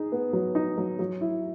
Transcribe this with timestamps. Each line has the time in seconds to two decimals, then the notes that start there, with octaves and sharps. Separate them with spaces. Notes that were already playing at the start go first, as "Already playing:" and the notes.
Already playing: D#4 G#4
0.12 B3
0.33 F#3
0.55 D#4
0.78 F#3
0.99 F#3
1.21 E4